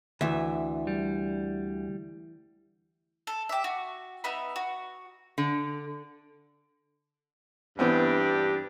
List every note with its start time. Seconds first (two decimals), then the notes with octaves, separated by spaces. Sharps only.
0.21 D2 E3 E5
0.87 G3
3.27 A4
3.49 G4 E5
3.64 F#4
4.24 B3 D#4 E5 B5
4.56 F#4
5.38 D3
7.79 G2 E3 B3 C4 D4 G4